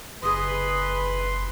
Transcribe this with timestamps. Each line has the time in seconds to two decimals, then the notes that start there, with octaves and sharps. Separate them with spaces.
0.23 F#1 G#4 B4 D#5 C6